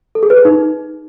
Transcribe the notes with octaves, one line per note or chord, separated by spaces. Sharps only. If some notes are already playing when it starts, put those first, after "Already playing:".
A4
G#4
B4
G#4
D#4